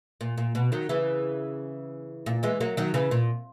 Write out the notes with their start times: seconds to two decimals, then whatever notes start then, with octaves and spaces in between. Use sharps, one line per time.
0.21 A#2
0.38 A#2
0.55 B2
0.72 D#3 F#3
0.89 C#3 E3
2.26 A#2
2.43 E3 G#3
2.60 F#3 A#3
2.77 D#3 F#3
2.94 C#3 E3
3.11 A#2